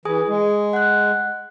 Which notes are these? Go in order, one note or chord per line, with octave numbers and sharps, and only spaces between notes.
E3 G#4 G#5 D#6
G#3
F#5 F#6